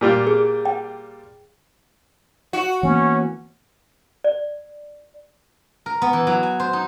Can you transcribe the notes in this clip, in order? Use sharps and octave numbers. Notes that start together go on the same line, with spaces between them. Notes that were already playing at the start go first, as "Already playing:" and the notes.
A#2 G3 F4
G#4
G5
F#4
E3 A#3 B3 C#4
D5
A#4
B3
E3
F#3
G#5
C5
D#4